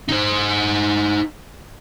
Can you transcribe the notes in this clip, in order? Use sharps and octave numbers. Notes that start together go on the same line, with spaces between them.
D#4 C5